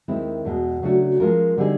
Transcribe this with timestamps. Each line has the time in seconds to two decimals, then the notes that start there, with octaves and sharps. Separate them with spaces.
0.08 D#2 D#3 G#3 C4 E4
0.45 E2 B2 G#3
0.83 C#3 F#3 A3 D4 F#4
1.20 F3 G#3 C#4 F4 A#4
1.58 D3 G3 C4 D#4 G#4